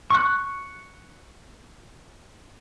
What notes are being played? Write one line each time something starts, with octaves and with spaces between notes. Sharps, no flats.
C#6 F#6